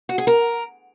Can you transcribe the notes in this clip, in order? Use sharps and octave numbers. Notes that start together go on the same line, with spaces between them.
F#4
G#4
A#4